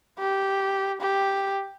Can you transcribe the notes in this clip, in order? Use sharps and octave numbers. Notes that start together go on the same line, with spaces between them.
G4
G4